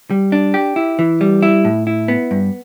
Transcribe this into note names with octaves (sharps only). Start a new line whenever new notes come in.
G3
D4
G4
E4
E3
G3
E4
A2
E4
B3
G2